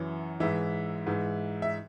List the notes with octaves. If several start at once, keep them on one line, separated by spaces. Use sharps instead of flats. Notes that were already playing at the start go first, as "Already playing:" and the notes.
Already playing: F#2 E3
G#2 E3 E5
G#2 E3
E5